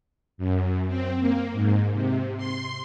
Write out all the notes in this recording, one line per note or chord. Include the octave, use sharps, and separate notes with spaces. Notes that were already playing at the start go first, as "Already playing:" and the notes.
F#2
C4
A#3
G#2
C3
C6